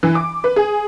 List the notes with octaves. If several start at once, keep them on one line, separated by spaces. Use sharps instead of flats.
E3
D6
B4
G#4